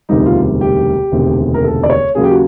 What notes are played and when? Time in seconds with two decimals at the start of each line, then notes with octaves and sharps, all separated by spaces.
0.09 E1 D2 C3 D#3 G3 D#4
0.26 F4
0.61 G4
1.12 E1 D2 C3 D#3
1.54 A#4
1.64 A4
1.83 D5
1.90 C#5
2.15 D#2 C#3 F#3 G#4
2.24 G4
2.31 F#4